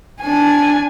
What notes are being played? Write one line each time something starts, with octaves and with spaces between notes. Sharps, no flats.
D4 G#5